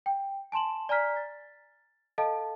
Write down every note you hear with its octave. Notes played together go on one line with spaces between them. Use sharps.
G5
G#5 A5 C6 E7 F#7
D5 G#5 A#5 F6 B6
A6
A4 D#5 F5 A5